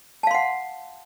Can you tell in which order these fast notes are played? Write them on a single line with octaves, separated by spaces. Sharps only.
A5 F5 C6 F#5